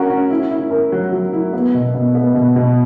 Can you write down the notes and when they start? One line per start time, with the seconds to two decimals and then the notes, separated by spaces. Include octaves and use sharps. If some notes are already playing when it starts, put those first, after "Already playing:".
Already playing: C#4 F#4 A#4
0.10 C#4
0.31 E4
0.51 E4
0.71 A#4
0.92 F#3
1.12 F#3
1.33 E4
1.53 B3
1.74 B2
1.94 B2
2.15 B3
2.35 B2
2.56 B2